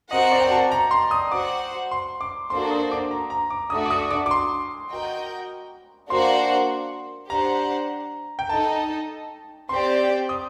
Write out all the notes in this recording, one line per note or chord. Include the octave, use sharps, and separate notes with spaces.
C4 F#4 A#4 D#5 F#5
D5
G5
A5
A#5
C6
D#6
F#4 C5 F#5 D6
C6
D6
A#3 D4 F#4 A4 C5 C6
D#6
D6
A#5
A#5
D6
A3 D4 F#4 D#6
D6
D#6
D6
D6
C6
F#4 A#4 D#5 G5
A#3 D4 F#4 C5 F#5 C6
D4 G4 C5 F#5 A#5
G5
D#4 A4 D#5 A5
C4 G4 D5 G5 C6
D#6